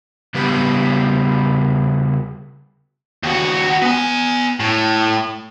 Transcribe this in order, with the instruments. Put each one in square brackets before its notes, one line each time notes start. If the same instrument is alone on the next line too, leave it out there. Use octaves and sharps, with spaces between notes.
[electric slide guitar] C#3 G3 B3 G4 B4
[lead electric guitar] D#2 F#4
B3 G#5
A2